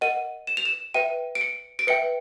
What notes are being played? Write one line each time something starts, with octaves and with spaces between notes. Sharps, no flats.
A#4 D#5 F#5 D#7
E7
F7
E7
B4 E5 G5 D#7
D7
C#7
D7
B4 E5 G5 C#7